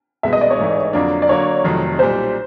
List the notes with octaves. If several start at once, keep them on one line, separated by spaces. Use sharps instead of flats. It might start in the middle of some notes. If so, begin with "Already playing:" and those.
C2 B2 G#3 B3 E5
D#5
D5
C#5
A1 G#2 E3 A3
F2 D3 F#3 A#3 D4
D5
D3 F#3 A#3 C#5
F1 F2 C3 D#3 F#3
B1 A#2 G3 C5